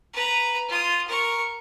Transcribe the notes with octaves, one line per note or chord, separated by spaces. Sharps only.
B4 A#5
F4 D#6
A#4 C#6